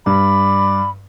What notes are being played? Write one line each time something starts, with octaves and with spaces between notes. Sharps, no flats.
G2 D5 B5